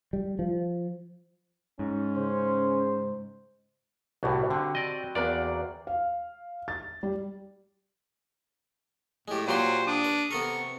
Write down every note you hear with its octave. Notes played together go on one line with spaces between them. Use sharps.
G3
F3
G#2 C#4
C#3 C5
C2 A2 G3 F#4
D3 C4
D5 D#5
E2 A#3 D5 F#5
F5
A6
G3
A2 G#3 G4
A#2 F#3 G4 C5 C6
D4 D#6
B4
C3 B3 A4 A#4 C#6